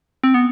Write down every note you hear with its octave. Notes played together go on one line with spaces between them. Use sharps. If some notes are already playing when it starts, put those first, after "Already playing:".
C4
B3